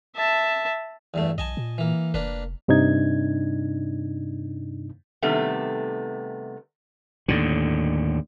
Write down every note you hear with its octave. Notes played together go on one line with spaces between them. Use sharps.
E5 A5
E2 G2 A3
B1 D#5 G#5 A5
A#2
E3 A#3
F1 A#3 D4 B4
G2 C3 D4 D#4 G#6
C3 D#3 G3 A3 B3
D#2 A2 D3